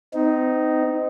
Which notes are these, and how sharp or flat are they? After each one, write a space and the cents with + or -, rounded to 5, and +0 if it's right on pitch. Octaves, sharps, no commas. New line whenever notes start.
C4 -35 D#4 +0